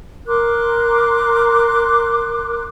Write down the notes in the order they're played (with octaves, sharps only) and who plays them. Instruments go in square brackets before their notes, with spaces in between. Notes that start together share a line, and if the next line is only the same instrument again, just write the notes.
[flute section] A#4 C6 D6 F#6